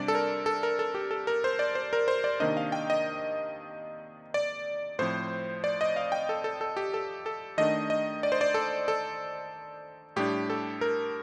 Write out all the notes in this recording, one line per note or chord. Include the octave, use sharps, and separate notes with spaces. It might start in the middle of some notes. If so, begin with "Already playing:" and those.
Already playing: C3 G3 D4 D5
A4
A#4
A4
A#4
A4
G4
A4
A#4
C5
D5
C5
A#4
C5
D5
C3 D#3 A#3 D4 D#5
F5
G5
D#5
D5
A2 F3 C4 C5
D5
D#5
F5
G5
A4
A4
A4
G4
A4
A4
D#3 A3 D4 D#5
D#5
D5
C5
D5
A4
A4
A2 G3 D4 G4
A4
A#4